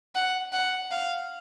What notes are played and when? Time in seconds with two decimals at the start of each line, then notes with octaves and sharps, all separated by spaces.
0.15 F#5
0.53 F#5
0.91 F5